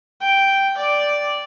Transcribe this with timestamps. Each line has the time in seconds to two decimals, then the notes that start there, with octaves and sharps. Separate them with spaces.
0.20 G5
0.77 D5